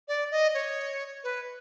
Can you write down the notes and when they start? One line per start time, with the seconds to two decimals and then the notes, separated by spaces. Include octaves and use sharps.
0.08 D5
0.31 D#5
0.54 C#5
1.24 B4